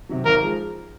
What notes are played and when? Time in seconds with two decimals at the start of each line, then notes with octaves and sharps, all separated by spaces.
0.09 C3 D#3 F#3
0.25 G#1 A#4
0.42 F3 G#3